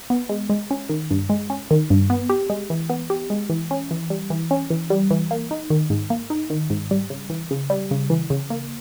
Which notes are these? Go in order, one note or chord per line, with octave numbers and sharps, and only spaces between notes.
B3
G#3
G#3
C#4
D#3
G2
G#3
C#4
D#3
G2
B3
G4
G#3
E3
B3
G4
G#3
E3
C#4
E3
G3
E3
C#4
E3
G3
E3
A#3
D#4
D#3
G#2
A#3
D#4
D#3
G#2
G3
C#3
E3
C#3
G3
C#3
E3
C#3
A#3